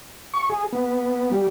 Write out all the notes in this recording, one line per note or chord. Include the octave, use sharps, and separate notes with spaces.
C#6
G#4
B3
G3